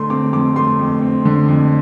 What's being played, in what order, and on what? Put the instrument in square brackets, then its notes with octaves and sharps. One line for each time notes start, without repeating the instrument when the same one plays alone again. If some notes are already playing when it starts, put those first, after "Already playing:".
Already playing: [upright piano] D3 A3 C6
C4 D6
F2 D6
A3 C6
F2
C4
D3
F2